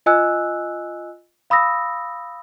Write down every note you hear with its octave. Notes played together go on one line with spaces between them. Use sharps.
F4 D#5 G#5 E6 F#6
F5 B5 D#6 E6 A#6